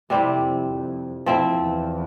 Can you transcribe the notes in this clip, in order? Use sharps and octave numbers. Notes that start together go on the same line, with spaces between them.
F2 C3 G3 C4 E4
F2
F2
F2 F3 C4 E4
E2